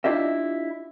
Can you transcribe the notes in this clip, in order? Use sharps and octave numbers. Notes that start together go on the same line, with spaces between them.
D4 E4 F4 G4 D#5 E5